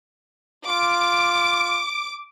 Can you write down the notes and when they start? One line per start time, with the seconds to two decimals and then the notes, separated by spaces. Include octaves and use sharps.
0.68 F4 D6